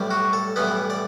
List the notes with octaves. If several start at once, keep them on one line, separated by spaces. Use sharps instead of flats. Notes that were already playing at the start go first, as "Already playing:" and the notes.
Already playing: B1 A2 G3
F#4
A4
B1 A2 E3 G3 B3 B4
D5